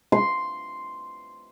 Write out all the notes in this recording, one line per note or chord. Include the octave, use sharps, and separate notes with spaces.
C6